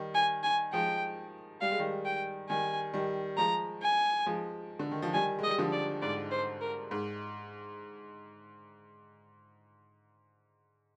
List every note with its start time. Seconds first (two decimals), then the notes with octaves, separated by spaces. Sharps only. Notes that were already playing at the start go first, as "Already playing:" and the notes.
Already playing: D#3 G3
0.15 G#5
0.43 G#5
0.73 F3 G#3 G5
1.61 G3 F5
1.71 G#3
1.79 D#3 G3
2.05 G5
2.49 D#3 G3 G#5
2.93 D#3 G3
3.37 F3 G#3 A#5
3.82 G#5
4.26 F3 G#3
4.79 D3
4.91 D#3
5.02 F3
5.14 D#3 G3 G#5
5.39 G#3
5.44 D#5
5.48 G3
5.58 D3 F3
5.73 D5
6.02 G#2 D5
6.31 C5
6.62 A#4
6.91 G#2